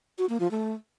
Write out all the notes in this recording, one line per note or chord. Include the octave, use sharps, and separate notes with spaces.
F#4
A#3
F3
A3